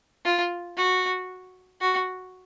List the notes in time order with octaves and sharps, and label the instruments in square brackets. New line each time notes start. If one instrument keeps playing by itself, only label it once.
[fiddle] F4
F#4
F#4